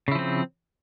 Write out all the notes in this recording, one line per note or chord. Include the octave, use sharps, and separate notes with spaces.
C#3 F3 C4 E4